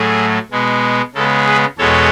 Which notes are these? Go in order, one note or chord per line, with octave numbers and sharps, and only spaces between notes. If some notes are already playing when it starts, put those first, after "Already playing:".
Already playing: A2 F#3 A3 G#4
B2 G#3 B3
C#3 G#3 B3 A4
G#4 B4
E2 B2 G#3 B3 A4 C#5